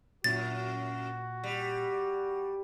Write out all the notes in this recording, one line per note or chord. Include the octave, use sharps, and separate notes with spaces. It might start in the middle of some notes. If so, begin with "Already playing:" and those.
F#2 A#2 F#4 A6
G3